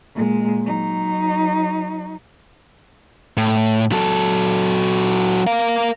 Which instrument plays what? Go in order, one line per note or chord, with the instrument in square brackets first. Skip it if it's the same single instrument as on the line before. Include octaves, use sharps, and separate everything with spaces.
[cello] A#2 G#3
F#3 D#4
[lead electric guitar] A2
F#3 A4
A#4 F5